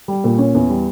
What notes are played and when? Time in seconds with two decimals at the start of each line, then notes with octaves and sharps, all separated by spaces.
0.08 G3
0.24 A#2
0.38 C#4
0.55 E2
0.69 G3